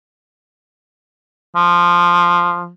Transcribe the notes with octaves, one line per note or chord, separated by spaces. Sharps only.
F3